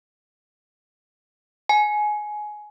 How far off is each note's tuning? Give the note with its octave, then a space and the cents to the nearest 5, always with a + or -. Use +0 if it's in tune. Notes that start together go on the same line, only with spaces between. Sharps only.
G#5 +15